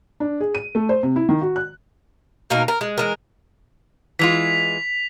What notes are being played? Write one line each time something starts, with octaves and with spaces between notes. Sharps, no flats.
D4
G#4
D#7
A3
C5
C3
E4
D#3
F#4
F#6
B2 A#3 D#4 A#4
A#4
G#3
E3 G#3 A#4
E3 G#3 F4 B6 F7